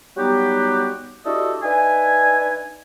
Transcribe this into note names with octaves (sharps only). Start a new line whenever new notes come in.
F#3 G3 B3 D#4 F#4 G4
D4 E4 F#4 G4 A4 D#5
D4 D#4 B4 E5 G#5